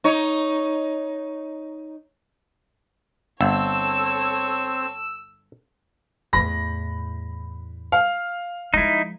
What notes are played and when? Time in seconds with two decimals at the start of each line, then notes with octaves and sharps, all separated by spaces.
0.04 D#4 C#5
3.41 G1 C4 A4 C#5 E6
6.33 E2 A2 B5 A#6
7.92 F5
8.74 F3 G#3 D#4 E4